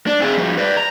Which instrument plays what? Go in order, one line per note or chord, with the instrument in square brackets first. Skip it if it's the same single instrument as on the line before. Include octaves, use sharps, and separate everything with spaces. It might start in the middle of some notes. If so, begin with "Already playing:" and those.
[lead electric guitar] D4
C4 G#4
F2 G3
B4 D5
A#5